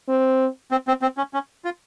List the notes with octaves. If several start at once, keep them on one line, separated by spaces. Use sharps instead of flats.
C4
C4
C4
C4
C#4
C#4
F4